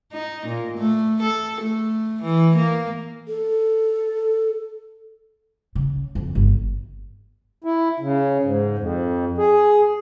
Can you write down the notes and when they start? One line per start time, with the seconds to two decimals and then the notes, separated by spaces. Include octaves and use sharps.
0.13 D#4
0.46 A#2
0.78 A3
1.22 A4
1.61 A3
2.22 E3
2.56 A#3
3.28 A4
5.75 C#3
6.15 F2
6.35 G1
7.64 E4
8.00 C#3
8.43 G#2
8.79 F2
9.38 G#4